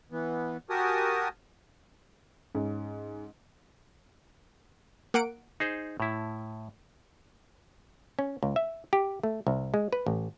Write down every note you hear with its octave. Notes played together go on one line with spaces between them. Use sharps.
E3 B3
F#4 G4 A#4 G#5 A5 D#6
G#2 C#4
A#3 F#5 D7
D#4 G#4 C5
A2 E4
C#4
C#2
E5
G4
A3
C2
G#3
B4
A1